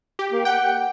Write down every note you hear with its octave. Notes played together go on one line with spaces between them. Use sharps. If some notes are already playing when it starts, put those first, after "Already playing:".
G4
A#3
F#5 G5